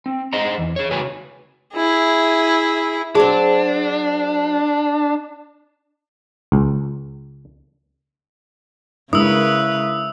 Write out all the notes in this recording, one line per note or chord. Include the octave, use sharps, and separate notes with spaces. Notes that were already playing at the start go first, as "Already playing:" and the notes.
C4
G#4 C5 D#5 F#5 A#5
E2
G#4 C#5
C#3 F#4 B4 C#5 G#5
E4 G#4
F#3 C4 D4 G#4
C#2
C#3 G#3 E4 A#4 B4 D#6 E6